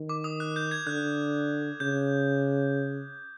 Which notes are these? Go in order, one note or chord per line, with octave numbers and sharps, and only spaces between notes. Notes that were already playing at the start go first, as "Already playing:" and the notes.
Already playing: D#3
D6
D#6
F#6
G6
G#6
D3 F#6
C#3 G6